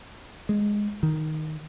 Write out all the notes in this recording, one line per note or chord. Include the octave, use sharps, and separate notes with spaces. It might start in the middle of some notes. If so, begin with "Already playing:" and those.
G#3
D#3